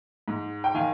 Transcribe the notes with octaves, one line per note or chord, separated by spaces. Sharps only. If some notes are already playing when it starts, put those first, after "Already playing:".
G#2
G5
D#3 F5 G#5